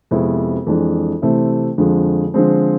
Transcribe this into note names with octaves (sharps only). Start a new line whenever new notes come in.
F2 C3 G#3 B3 E4
F2 E3 G#3 D4
C3 E3 A3 C4 E4
F2 D3 F3 G#3
D3 F3 G#3 C4